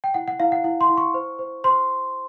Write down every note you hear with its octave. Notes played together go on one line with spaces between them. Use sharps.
G5
E4 F#5
F#5
E4 F5
F#5
E4 F#5
C6
E4
C#6
C5
C5
C5 C6